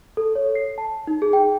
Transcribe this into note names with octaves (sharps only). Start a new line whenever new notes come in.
A4
C#5
C7
A5
D#4
G#4
G5